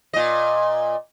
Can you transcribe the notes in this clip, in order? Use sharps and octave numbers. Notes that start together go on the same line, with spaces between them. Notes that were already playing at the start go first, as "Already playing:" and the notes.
A#2 D#5